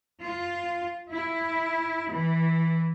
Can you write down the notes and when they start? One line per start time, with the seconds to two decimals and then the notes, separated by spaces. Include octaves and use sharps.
0.22 F4
1.11 E4
2.10 E3